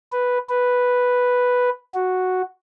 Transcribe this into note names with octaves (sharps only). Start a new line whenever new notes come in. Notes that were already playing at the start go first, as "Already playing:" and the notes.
B4
B4
F#4